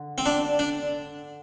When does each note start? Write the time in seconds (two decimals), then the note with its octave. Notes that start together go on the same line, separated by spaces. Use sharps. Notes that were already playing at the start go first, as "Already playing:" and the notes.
Already playing: D3
0.18 C4
0.26 D4
0.59 D4